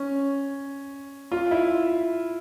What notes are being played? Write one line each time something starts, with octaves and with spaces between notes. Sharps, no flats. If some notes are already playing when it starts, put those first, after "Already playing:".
Already playing: C#4
F4
E4